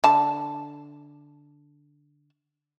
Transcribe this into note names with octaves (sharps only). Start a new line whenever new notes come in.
D3 A5